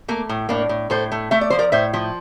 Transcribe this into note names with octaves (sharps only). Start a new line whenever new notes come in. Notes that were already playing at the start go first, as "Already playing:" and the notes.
A3 A#3
A2
A2 A#3 D4
A2
A2 A4 C5
A3
A3 E5
D5
F3 C5
A#4 D5
A2 C5 E5
F3